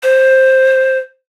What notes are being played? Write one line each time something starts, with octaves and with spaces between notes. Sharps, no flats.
C5